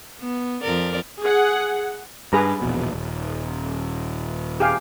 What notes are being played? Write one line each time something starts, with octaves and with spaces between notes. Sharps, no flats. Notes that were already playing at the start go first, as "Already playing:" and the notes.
B3
F2 A#4 D5
G#4 F#5
G2 G#4 B4 A#5
E1 A#1 B2
D#1
G4 G#4 F5